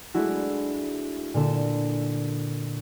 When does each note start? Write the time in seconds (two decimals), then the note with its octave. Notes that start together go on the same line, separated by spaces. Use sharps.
0.14 G#3 A3 D4 E4 F#4
1.34 A#2 D3 A4 E7